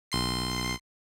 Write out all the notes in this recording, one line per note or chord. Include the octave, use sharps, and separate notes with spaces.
B1 C6 C7